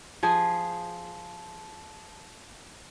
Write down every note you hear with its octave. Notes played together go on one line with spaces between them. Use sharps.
F3 G#4